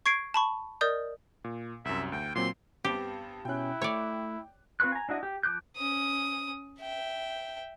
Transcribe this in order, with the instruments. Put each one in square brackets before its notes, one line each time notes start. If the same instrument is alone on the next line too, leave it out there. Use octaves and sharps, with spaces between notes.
[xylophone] C#6 G#6 C7 D7
A5 B5 C#6
A#4 D5 D#5 D#6 G6
[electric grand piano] A#2
[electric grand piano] C2 F#2 [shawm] E5
[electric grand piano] D2 [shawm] G5
[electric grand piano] A#2 F#3 C4 [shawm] C6
[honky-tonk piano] G2 B3 C4 [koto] G4
[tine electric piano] B2 C#4 [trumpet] E4 [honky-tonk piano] G5 F#6
[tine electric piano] A3 [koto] C#5 D5
[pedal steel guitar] C4 F4 B4 C#6 F#6
G#5 A#5
D4 E4 F#4 D#5
G4
F3 D6 F#6 G6
[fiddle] C#4 D#6
E5 G5